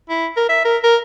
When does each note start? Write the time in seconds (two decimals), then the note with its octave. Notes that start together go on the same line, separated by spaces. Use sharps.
0.09 E4
0.37 A#4
0.49 E5
0.65 A#4
0.83 A#4